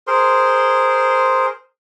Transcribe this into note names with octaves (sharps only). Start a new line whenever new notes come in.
G#4 A#4 C5 C6